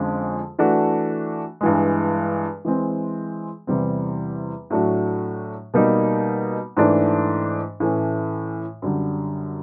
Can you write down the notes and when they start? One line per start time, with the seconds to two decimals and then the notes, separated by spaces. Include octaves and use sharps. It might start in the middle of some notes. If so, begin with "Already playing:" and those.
Already playing: F2 D3 F3 G#3 C#4
0.59 E3 A3 D4 F#4
1.61 G2 E3 G#3
2.65 E3 G#3 C4
3.67 E2 C3 E3 G3 C4
4.70 A2 F#3 A3 D4 F#4
5.74 B2 G3 A#3 D#4
6.77 G#2 E3 A3 D4
7.80 A2 E3 A3 C#4
8.82 F#2 D3 G3